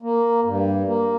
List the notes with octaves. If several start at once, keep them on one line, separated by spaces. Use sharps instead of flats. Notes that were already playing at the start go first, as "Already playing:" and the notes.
A#3
G2
A#3